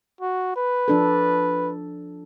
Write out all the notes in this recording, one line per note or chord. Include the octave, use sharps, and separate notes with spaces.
F#4
B4
F3 D4 A4